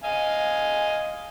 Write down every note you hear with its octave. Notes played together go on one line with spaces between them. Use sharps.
D#5 F5 G#5